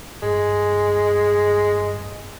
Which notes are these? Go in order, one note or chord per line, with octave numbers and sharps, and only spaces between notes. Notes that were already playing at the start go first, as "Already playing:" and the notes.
G2 G#3